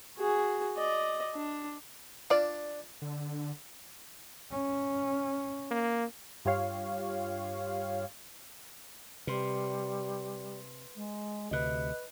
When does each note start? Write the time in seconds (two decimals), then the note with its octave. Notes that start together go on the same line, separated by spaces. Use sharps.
0.18 F#4 G#4
0.77 D5 D#5
1.34 D4
2.30 D4 F4 D5
3.02 D3
4.51 C#4
5.71 A#3
6.45 G2 F4 G4 C#5 F5
9.27 C3 G3 B4 C6
10.95 G#3
11.51 D2 C3 B4 D#5 F#6